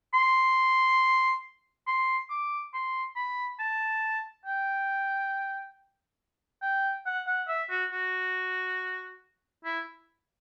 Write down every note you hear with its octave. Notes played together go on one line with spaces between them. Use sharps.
C6
C6
D6
C6
B5
A5
G5
G5
F#5
F#5
E5
F#4
F#4
E4